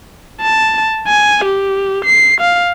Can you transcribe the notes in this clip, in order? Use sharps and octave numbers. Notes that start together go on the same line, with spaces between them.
A5
G#5
G4
C7
F5